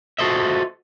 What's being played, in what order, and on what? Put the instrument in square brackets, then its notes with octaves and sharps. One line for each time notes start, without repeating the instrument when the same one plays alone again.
[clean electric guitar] F4 F#4 A4 C5 D#5 E5